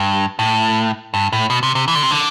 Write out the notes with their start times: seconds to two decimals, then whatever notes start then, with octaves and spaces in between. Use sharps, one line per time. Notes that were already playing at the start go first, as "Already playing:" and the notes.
Already playing: G2
0.39 A2
1.14 G2
1.33 A2
1.50 B2
1.63 C3
1.75 C3
1.88 E3
1.95 D3
2.03 C3
2.11 D3